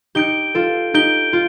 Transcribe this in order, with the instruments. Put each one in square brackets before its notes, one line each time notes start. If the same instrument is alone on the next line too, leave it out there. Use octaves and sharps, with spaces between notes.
[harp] D#4 G4 [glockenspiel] G6 D7 G7
[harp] F4 A4
[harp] D#4 G4 [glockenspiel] G6 D7 G7
[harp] F4